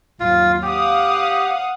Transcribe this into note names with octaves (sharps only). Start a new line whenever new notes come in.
G#1 D#2 F#3 F4
G4 F5 F#5 D#6